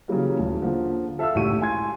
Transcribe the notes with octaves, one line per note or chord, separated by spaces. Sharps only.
C#3 E3 F#3 G3 A#3
D#1
D3 F3 A#3
A4 E5 F5 A5 E6
G#1 C#2 A2 G4 C#6 D#7
G#5 C6 G#6